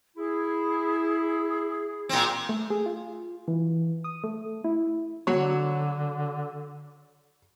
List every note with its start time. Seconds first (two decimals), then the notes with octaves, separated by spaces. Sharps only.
0.17 E4 G#4
2.09 A#2 C4
2.49 A3
2.70 G#4
2.86 F4
3.48 E3
4.04 D#6
4.24 A3
4.64 E4
5.27 D3 F#3 C#5